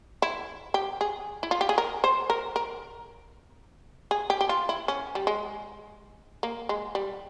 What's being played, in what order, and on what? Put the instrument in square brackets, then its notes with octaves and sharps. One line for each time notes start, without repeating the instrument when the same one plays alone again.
[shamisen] E4
G4
G#4
E4
F4
G4
G#4
A#4
C5
A#4
A#4
G#4
G4
G4
F4
E4
C#4
G3
G#3
A#3
G#3
G3